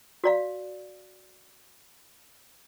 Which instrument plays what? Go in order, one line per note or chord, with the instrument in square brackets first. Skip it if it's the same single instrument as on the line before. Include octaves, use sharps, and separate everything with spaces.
[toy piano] F#4 D5 F5